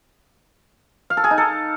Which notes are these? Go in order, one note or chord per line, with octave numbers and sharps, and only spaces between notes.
F5
A4
G#4
D#4
A4